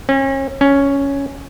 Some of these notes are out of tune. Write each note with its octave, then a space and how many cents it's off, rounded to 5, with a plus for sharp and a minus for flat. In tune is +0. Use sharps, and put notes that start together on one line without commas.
C#4 -35
C#4 +5